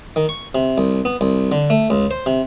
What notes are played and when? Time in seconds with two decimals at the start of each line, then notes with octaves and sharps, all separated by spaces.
0.16 D#3
0.29 C#6
0.55 C3
0.78 C2
1.05 B3
1.21 C2
1.52 D3
1.70 A3
1.90 C#2
2.11 C5
2.26 C3